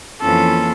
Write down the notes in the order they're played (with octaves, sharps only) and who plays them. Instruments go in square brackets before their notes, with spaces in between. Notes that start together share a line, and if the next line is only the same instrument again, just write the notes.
[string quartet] F2 E3 A#3 C#4 F4 A4